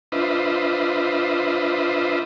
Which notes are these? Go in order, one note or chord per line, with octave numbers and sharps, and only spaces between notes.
D4 F4 B4 C5 D#5 E5